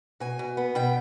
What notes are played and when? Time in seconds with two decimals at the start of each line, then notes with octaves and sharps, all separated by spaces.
0.20 B2 G#5
0.39 B2
0.57 B3
0.75 B2 G5